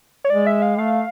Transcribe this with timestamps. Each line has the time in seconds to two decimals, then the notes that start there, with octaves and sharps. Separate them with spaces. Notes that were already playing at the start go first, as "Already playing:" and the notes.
0.24 C#5
0.30 G#3 D5
0.47 E5
0.62 F5
0.78 A3 F5